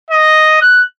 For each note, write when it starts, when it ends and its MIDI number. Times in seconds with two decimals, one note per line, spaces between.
0.11 0.58 75
0.62 0.83 90